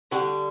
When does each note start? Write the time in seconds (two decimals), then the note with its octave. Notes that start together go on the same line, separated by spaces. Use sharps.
0.11 D3 G3 F#4